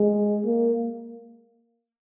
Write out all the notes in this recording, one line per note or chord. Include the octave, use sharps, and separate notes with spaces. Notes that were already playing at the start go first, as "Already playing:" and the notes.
Already playing: G#3
A#3